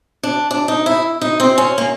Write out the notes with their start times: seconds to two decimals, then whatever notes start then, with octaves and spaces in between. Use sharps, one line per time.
0.23 D4
0.51 D4
0.68 D#4
0.86 E4
1.21 D#4
1.40 C4
1.58 C#4
1.78 A#3